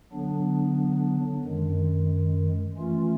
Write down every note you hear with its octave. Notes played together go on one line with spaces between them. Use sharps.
D3 F#3 B3 D4
F#2 D#3 G#3
E3 A3 C#4 F4